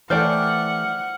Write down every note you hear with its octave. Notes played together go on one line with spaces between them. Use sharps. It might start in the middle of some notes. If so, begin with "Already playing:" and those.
E3 A3 C5 D5 F#5 G5 F6